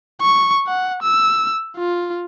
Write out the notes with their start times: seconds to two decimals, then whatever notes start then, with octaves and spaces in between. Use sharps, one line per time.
0.21 C#6
0.67 F#5
1.02 E6
1.77 F4